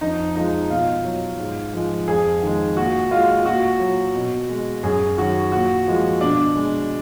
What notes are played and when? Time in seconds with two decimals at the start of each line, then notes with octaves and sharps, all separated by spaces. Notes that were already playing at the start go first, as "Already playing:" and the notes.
0.01 F2 D#4
0.36 F3 G#3 D#4
0.70 B2 F4
1.05 F#3
1.39 G#2
1.74 F3 G#3
2.08 F2 G#4
2.42 D#3 G#3
2.77 A#2 F#4
3.11 G#3 F4
3.45 A#2 F#4
3.80 F#3
4.15 B2
4.49 G#3
4.83 F#2 G#4
5.18 D#3 F#3 F#4
5.52 A#2 F#4
5.87 F3 G#3
6.21 B2 D4
6.55 G#3